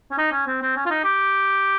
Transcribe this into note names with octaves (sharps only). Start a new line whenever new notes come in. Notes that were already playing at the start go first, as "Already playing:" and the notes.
C#4
D#4
C#4
C4
C4
C#4
F4
D#4
G4